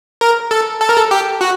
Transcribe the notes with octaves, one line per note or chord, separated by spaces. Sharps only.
A#4
A4
A4
A#4
A4
G4
F#4